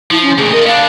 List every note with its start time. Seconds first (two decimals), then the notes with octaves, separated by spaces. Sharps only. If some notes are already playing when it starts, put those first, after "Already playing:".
0.11 F3 E4
0.23 C#4
0.38 D2 A#2 G#4
0.52 F4 A#4 D#5
0.67 B3 D4 F5